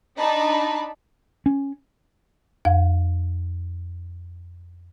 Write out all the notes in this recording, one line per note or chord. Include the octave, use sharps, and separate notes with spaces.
D4 D#4 A5 B5
C#4
F2 F5